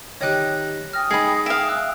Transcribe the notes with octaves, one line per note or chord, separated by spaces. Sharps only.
D#3 D#4 G4 C#5 G5 F#6
G5 G#5 D#6 F6 A#6
G#3 D#4 G#4 B5
E5 F5 D7
E6 F#6